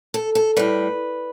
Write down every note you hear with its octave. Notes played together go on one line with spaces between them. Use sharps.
A4
A4
A2 G3 B4